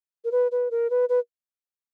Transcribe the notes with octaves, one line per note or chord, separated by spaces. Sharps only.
A#4
B4
B4
A#4
B4
B4